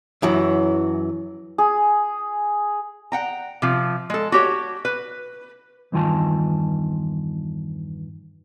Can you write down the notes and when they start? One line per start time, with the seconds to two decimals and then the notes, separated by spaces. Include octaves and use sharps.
0.22 F#2 E3 F#3
1.58 G#4
3.12 F#5 G5 A#5
3.62 C3 F3
4.10 G#3 A4
4.32 F#4 G4 C#5
4.85 B4
5.92 E2 G2 D#3 F4 G#5 A5